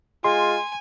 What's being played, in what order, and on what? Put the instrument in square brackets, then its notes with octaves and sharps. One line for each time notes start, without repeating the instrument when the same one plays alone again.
[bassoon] G#3 [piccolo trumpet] F4 [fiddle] G#5 [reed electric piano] C6